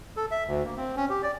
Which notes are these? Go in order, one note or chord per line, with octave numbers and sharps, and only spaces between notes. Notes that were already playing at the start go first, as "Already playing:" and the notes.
A4
E5
D2
A#3
C4
C#4
G4
D5